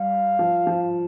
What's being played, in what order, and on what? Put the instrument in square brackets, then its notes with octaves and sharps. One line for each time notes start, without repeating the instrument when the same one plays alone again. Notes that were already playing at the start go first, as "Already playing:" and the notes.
Already playing: [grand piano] G3 [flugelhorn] F5
[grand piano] F3
F3